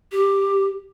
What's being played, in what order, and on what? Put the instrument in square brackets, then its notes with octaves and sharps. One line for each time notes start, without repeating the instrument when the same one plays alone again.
[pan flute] G4